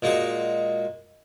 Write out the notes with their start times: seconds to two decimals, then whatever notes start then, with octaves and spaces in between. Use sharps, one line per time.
0.02 A#2 G#3 F#4